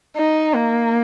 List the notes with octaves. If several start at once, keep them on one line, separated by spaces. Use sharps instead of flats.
D#4
A#3